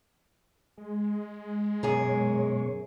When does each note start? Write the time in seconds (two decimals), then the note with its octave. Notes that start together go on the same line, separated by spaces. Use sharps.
0.78 G#3
1.83 F#2 B2 G#4 A#4 C#5